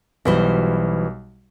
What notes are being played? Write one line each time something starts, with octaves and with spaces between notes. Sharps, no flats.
B1 B2 E3 G3 B4 C5